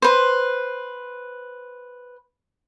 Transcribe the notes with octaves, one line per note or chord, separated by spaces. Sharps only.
B4 C5